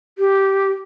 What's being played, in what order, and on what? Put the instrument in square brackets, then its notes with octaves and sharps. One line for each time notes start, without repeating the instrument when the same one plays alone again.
[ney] G4